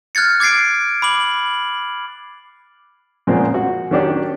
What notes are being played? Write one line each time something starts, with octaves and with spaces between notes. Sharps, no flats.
F6 F#6 G#6 A6 C#7
D6 G#6 A6 C7 D7
B5 D6 F#7
A#2 C#3 F3 G#3 B3 C4
F#4
D#3 F#3 C#4 D4 G4 D5